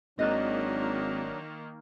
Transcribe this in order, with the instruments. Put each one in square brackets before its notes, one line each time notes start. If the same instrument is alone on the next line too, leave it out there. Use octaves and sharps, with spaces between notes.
[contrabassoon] G#1 [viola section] D#3 A#3 [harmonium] F#3 D4 [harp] D#5 F#6 A6